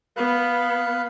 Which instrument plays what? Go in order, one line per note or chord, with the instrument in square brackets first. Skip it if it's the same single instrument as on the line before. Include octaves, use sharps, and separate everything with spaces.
[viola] B3 [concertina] F5 B5 F#6